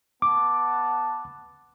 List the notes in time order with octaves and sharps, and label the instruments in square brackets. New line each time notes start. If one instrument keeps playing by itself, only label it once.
[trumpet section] B3 F#5 A5 [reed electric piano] D6